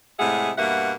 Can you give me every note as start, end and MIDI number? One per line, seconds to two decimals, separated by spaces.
0.19 0.51 45
0.19 0.51 48
0.19 0.51 56
0.19 0.51 68
0.19 0.51 76
0.19 0.51 78
0.58 0.92 43
0.58 0.92 47
0.58 0.92 58
0.58 0.92 76
0.58 0.92 78